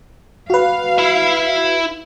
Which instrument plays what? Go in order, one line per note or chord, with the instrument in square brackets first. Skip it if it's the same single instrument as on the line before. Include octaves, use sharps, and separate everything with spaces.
[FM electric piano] F#4 B4 [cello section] F5
[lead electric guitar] E4 E5